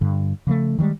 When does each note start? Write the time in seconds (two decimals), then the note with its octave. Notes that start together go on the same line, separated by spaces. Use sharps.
0.01 G2 D3
0.47 C#3 F3 G3 A3
0.79 D#3 E3 G3 G#3